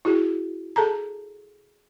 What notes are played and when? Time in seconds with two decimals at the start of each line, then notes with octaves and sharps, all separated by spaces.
0.05 E4 F#4 G#4
0.76 G#4 A4 A5 A#5